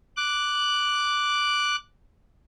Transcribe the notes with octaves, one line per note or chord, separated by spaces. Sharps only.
D6 F#6